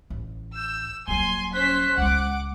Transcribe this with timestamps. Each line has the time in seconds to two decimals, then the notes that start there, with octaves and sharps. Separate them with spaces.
0.10 A1
0.56 E6 G6
1.08 D#1 F#3 G#5 C6 G7
1.54 C#4 C5 F#6 B6
1.98 C#2 G#3 F#5 D6